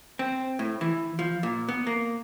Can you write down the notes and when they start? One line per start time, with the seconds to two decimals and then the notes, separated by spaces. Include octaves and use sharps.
0.19 C4
0.59 A2
0.81 E3
1.19 F3
1.43 A#2
1.69 B3
1.87 A#3